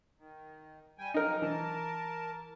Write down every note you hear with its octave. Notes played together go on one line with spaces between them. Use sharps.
D#3
G3 G5 G#5
F3 F#3 D#4 A#4
E3 A#4 A5